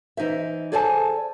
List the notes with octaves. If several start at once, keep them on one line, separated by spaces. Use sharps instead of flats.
E3 D#4 C5 E5
G#4 A4 C5 D5 G#5 A5